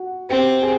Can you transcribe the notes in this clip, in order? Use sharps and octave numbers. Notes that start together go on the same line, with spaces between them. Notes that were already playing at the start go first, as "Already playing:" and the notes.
Already playing: F#4 F#5
C4 G4 G5
G#4 G#5